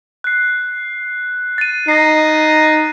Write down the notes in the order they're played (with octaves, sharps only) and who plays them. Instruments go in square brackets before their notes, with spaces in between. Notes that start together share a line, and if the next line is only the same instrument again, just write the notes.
[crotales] F#6 C7
A6 D#7
[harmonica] D#4 [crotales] A#6 C7